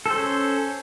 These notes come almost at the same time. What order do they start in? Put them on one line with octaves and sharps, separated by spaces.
A4 C5 C#4